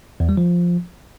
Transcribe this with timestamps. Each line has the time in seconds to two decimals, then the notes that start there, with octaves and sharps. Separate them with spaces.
0.20 E2
0.29 G3
0.37 F3